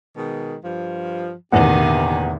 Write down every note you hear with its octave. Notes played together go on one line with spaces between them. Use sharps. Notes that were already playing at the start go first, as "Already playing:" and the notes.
B2 D#3 G#3
G2 F3
A1 E2 B2 D3 D#3 A#3 G4 F#5